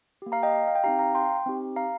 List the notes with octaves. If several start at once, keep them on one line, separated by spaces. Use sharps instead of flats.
A#3 G4
F5 A#5
D#5 G5
F5
G5
C4 D#4 G4 F5 A#5
F5 A#5
G5 C6
C4 D#4 G4
F5 A#5